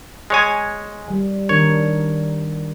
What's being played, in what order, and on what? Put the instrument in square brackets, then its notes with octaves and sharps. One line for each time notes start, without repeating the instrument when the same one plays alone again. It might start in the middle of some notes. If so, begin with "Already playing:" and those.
[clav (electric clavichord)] G#3 C#5 G#5
[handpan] G3
[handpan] D#3 D4 A#4 [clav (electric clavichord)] C#5